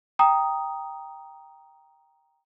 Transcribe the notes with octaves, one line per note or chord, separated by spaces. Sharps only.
G5 A#5 D#6